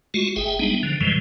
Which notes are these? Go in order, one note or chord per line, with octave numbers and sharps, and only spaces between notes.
G#3 A3 F4 F#4
G#1 G#4 E5 G5
G3 G#3 B3 D4 D#4
D3 F3
F#2 C3 E3 F3 G3 G#3